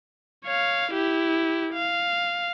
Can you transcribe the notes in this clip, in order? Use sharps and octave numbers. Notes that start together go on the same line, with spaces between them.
C#5 F5
E4 G4
F5